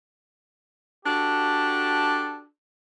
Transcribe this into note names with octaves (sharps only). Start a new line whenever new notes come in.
D4 F#4 G4 A4